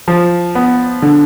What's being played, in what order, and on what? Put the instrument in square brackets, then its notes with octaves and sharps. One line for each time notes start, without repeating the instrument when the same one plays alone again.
[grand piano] F3
B3
D3